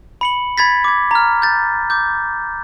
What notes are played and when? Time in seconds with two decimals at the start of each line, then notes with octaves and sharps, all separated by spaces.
0.21 B5 C#7 F#7
0.58 B5 G#6 A6 B6
0.84 D6 G#6
1.11 A#5 F6
1.42 G6 A6
1.90 D6 G6